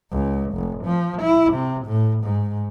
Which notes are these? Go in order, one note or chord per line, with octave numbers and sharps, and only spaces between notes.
C#2
F1
F3
E4
C3
A2
G#2